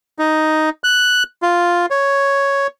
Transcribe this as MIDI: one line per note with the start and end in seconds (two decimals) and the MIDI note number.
0.19 0.70 63
0.84 1.23 90
1.42 1.86 65
1.91 2.67 73